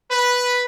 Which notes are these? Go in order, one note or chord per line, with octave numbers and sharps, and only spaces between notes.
B4